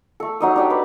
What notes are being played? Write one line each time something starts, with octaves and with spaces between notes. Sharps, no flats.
A3 A4
F#3 D#4 D#6
D4 G4 G5
B4